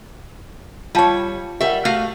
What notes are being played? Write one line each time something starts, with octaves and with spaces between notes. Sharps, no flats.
G3 F4 C#5 F5 A5
G3 G4 A#4 E5 F#5
A3 F#4 F5